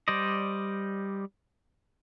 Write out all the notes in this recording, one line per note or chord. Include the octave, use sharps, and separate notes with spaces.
G3 C5 D5 D#5